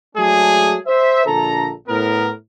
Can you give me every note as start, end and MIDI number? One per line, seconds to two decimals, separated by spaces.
0.16 0.75 54
0.16 0.75 56
0.16 0.75 57
0.16 0.75 62
0.16 0.75 68
0.87 1.23 72
0.87 1.23 76
1.26 1.69 34
1.26 1.69 50
1.26 1.69 69
1.26 1.69 82
1.87 2.30 45
1.87 2.30 59
1.87 2.30 70